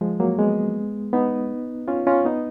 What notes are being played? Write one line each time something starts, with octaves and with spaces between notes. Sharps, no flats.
F3 G#3
F#3 A#3
G#3 B3
B3 D#4
C#4 F4
C#4 F4
B3 D#4